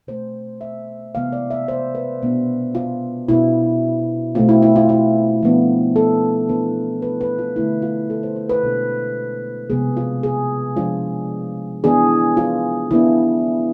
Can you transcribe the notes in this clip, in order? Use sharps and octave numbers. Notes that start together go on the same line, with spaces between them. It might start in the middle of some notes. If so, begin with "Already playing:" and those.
B2 A3 C4 C5
E5
C3 E3 G#3 B3 F5
D5
E5
C5
B4
B2 B3 D4
F4
B2 B3 D4 E4
B2 A3 C4 F4
E4
E4
F4
F4
F3 B3 D4
A4
E3 B3 D4 B4
B4
B4
F4
D3 A3 D4 E4
F4
A4
C5
C5
B4
B2 G#3 D4 A4
C3 F3 G#3 B3 G#4
F4
G#4
F3 G#3 D4 F4
E3 B3 D4 G#4
F4
E3 B3 D4 E4